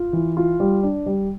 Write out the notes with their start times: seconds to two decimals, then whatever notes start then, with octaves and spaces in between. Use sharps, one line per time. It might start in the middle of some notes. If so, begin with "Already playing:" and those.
Already playing: F4
0.13 E3
0.37 F4
0.60 G3
0.83 D4
1.06 G3